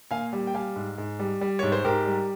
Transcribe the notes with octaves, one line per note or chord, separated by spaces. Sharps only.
A#2 F5 G#5
G3
G5
G3 F5 G#5
G#2
G#2
G3
G3
G#2 C#5
C5
G#2 G4 A#4
G3